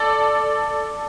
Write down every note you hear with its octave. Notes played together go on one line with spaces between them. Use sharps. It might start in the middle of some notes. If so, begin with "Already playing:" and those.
Already playing: A4 D5